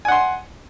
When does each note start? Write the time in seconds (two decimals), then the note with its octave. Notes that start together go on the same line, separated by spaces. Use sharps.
0.05 G#5
0.08 F#5
0.12 C6